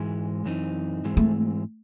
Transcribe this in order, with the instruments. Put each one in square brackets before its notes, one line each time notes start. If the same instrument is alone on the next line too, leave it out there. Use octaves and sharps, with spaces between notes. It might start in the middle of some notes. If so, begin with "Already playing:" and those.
Already playing: [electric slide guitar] G#2 E3 G#3
F#2 E3 C4 D#4
G#2 E3 G#3 C4
[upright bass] A3